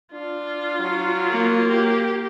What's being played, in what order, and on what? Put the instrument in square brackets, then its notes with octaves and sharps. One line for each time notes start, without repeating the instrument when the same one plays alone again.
[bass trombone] D4 [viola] F4
[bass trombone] F#3
[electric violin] A#3
[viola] G4